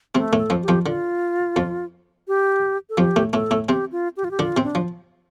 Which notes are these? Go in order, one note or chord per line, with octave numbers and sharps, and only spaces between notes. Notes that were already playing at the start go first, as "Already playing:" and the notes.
C3 A3 C4
A2 A3
A4
F2 F3
G4
F2 F3
D3 F4
F2 F3
G4
A4
F2 F3 G4
A2 A3
A2 A3 A4
A2 A3
C3 C4 G4
F4
G4
F4
G4
D3 D4 F4
C3 C4
D4
F3